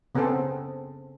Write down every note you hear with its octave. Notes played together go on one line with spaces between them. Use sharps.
C#3 B3 C4 G#4 A4 C5